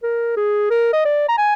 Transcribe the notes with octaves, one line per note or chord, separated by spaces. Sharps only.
A#4
G#4
A#4
D#5
D5
A#5
G#5